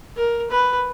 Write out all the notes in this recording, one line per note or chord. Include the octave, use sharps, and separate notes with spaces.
A#4
B4